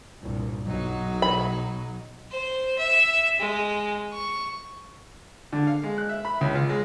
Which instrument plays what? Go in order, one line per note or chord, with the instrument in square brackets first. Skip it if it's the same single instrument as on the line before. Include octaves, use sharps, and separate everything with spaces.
[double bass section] C2 G2 A#2
[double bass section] B1 [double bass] F#3 [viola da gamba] D#4
[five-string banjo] B5
[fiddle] C5
E5
G#3
C#6
[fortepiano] D3
F5
G#3
F#6
E5
B5
C#2
F4
G#3